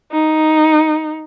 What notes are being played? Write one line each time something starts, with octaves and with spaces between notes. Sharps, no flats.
D#4